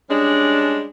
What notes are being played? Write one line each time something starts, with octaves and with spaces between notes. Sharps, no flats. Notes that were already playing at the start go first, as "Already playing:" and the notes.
G3 G#3 C#4 D4